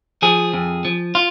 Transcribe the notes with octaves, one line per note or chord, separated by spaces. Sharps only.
F3 G#4
F2
F3
F4